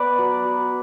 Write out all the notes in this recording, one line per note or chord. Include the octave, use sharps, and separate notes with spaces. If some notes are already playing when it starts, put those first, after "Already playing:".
Already playing: B3 B4 D5
F#3
F#3